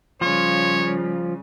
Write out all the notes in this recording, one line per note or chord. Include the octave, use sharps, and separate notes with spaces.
C#3 F3 G3 F4 C#5